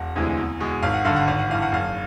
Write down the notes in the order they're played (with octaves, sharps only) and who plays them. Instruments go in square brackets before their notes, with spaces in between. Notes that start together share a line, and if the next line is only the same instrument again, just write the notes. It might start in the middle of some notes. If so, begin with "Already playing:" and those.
Already playing: [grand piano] E1 F#5
D2 C3 E3 G#3
E2
B2 G#3
G#1 F5
F#5
G2 D3 F5
F#5
G#1 F5
F#5
G2 E3 F5
F#5
F#1 F5